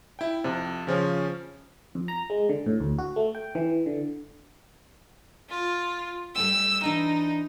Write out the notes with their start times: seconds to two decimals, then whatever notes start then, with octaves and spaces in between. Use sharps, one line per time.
0.19 E4 G5
0.44 F2 C3
0.87 C#3 F3 C#4
1.95 F2
2.08 A#5
2.30 G#3
2.49 D3
2.66 A2
2.80 D2
2.99 F#4
3.16 A3
3.35 G5
3.55 E3
3.86 D3
5.50 F4
6.35 G3 A3 G5 E6
6.84 E3 D4 D#4